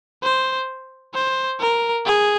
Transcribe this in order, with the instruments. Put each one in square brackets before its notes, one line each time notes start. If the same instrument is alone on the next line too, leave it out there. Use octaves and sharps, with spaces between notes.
[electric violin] C5
C5
A#4
G#4